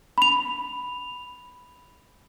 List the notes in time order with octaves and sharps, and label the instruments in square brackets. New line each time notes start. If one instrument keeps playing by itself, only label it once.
[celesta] B5 F7